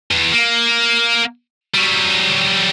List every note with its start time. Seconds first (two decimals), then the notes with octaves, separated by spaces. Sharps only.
0.11 E2
0.33 A#3
1.75 F#3 G3